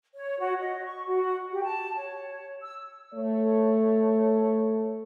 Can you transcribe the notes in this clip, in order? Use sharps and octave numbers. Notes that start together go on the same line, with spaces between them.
C#5
F#4
D#5
C#6
F#4
G4
A5
C#5
E6
A3 C#5